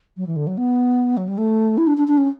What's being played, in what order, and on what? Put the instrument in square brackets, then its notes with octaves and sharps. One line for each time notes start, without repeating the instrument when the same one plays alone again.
[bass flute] F#3
E3
D3
F#3
B3
F#3
G3
A3
E4
D4
D4
D4
C#4